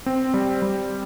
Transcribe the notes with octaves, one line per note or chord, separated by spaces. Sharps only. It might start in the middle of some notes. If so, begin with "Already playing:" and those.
C4
G3
G3